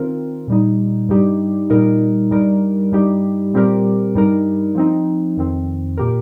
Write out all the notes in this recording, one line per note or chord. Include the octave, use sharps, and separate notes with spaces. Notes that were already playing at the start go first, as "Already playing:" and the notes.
Already playing: D#3 C4 F4 A#4
A#2 G3 D#4
G2 G3 D#4 G4
A#2 G3 D#4 A#4
G2 G3 D#4 A#4
G2 G3 D#4 G4
A#2 G3 C4 G4 A#4
G2 G3 D#4 A#4
F3 C4 D#4
F2 D#3 C4
A#2 A#3 G4 A#4